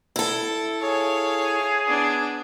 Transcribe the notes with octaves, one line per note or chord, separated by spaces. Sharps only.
E4 A4
G#4 C#5 F5
B3 D4